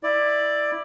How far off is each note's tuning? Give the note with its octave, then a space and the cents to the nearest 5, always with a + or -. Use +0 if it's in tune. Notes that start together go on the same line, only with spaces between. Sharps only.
E4 +0 D5 +10